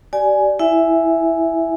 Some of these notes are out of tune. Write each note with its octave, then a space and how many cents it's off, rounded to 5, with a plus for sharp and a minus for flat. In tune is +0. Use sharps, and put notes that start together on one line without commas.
G4 -35 D5 +0 G#5 +10
E4 +0 E5 +0 G#5 +0